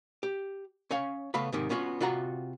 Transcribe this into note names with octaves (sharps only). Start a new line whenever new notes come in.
G4
C#4 C#5 F5
C#3 A3 B3 F5 B5
G#2 C3 D#3
B3 C#4 F4 F#4
C3 F4 F#4 F#5 A#5